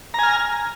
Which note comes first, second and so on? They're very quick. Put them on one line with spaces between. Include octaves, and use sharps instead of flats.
A#5 G#5 F6